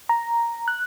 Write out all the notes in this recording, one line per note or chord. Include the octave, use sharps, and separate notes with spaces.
A#5
F#6